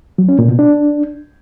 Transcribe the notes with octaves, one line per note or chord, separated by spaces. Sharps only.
F#3
C#4
A#2
B2
D4